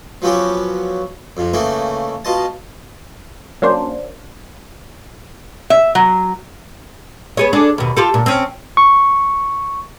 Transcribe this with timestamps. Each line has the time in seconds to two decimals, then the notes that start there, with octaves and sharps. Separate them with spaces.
0.22 F3 F#3 B3 C#4 F#4 G4
1.37 F2 C3
1.53 C#3 E3 A3 A#3 D#4
2.25 B2 F4 D#5 A5
3.62 F#3 A#3 C#4 D4 C5
5.70 E5
5.95 F#3
7.37 B3 G#4 C#5
7.53 D4 G#4 A4
7.78 D#2 B2
7.96 F4 G4 A4
8.14 A#2
8.26 C4 C#4
8.77 C#6